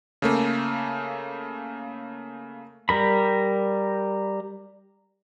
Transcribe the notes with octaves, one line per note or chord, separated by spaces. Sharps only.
C#3 A3 A#3
G3 A#4 B5